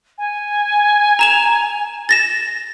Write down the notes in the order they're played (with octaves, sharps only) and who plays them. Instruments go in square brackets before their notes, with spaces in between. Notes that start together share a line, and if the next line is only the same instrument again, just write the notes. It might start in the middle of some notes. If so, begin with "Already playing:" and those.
[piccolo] G#5
[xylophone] A#5 E7 F7
A6 A#6 E7